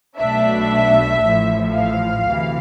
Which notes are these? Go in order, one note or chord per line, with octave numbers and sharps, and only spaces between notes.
B1 B2 A3 D4 E5
A1 A2 F3
F5
D2 C3 E3